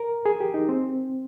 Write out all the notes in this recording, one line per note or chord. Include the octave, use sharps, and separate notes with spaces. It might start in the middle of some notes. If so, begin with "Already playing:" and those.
Already playing: A#4
G#4
G4
D#4
C4